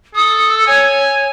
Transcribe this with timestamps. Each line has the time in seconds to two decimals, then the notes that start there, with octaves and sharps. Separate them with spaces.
0.15 A4 D#6
0.48 E6
0.67 C#5 G#5